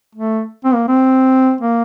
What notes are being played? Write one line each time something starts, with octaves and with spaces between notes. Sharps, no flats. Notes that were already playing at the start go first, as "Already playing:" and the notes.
A3
C4
A#3
C4
A#3